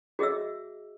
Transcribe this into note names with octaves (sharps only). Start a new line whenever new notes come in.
F#4 G#4 D#5 E5 E6